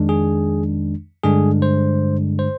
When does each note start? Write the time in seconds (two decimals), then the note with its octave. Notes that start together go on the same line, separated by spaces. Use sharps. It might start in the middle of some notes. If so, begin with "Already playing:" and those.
Already playing: F2 D#3 G#3 D4
0.09 G#4
1.23 G2 D3 G#3 D4 G#4
1.62 C5
2.39 C5